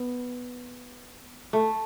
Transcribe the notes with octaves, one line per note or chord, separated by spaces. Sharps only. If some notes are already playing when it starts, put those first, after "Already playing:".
Already playing: B3
A3